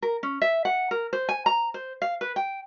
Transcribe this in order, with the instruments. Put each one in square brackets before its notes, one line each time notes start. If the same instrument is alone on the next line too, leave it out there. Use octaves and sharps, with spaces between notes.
[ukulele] A#4
C#4
E5
F#5
A#4
C5
G#5
A#5
C5
F5
B4
G5